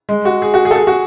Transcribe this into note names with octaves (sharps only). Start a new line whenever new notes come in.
G#3
F#4
G#4
F#4
G#4
A4
G#4
F#4